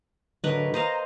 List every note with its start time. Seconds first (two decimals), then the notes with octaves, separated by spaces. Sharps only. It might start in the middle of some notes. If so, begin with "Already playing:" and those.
0.44 D3 F#3 A#4 B4 D#5
0.74 C5 D#5 F5 A#5